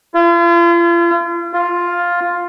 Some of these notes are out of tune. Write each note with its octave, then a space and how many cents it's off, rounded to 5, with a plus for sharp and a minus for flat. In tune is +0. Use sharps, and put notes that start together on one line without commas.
F4 -40
F4 +5